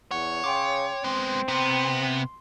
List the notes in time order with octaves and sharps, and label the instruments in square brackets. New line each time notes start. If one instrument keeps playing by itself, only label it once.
[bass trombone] E2 [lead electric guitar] C#5 [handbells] F#5
[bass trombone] C#3 [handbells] G5 C6 D6
[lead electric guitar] G#3 B3 [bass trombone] C4
[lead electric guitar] C3 [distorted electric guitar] B3 [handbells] C6